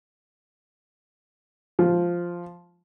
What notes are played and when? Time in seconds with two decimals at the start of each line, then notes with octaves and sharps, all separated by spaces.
1.79 F3